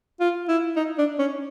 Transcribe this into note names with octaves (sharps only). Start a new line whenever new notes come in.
F4
E4
D#4
D4
C#4